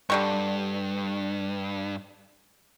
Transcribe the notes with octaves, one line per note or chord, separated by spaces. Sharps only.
G2 D3 G3 C#6